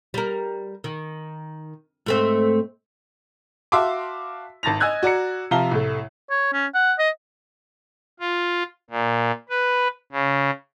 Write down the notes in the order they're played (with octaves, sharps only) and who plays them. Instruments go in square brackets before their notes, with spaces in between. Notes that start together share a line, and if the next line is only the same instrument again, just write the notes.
[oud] G3 A#4
D#3
G#2 A3 C4
[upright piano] F#4 E5 F5 A5 C6 D6
G#1 A5 A6 A#6 F7
D#5 G#5 E6 F#6 G#6
F#4 D5 A#5 C#7
C3 F3 F5 A5 A#5 G7
C2 A2 A3
[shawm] C#5
C#4
F#5
D#5
[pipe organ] F4
A#2
B4
C#3